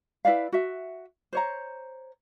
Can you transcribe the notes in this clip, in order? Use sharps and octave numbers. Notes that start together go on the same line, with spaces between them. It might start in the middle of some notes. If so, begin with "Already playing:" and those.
E4 B4 D5 F5
F#4 E5
C5 C#5 A#5